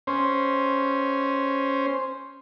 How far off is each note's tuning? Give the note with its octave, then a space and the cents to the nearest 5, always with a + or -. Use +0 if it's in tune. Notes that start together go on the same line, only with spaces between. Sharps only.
C#4 +0 C5 +0